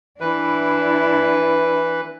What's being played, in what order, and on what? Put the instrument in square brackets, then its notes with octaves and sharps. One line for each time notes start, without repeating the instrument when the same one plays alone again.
[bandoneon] E3 B4 [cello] D4 E4